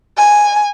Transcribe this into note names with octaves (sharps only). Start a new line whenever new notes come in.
G#5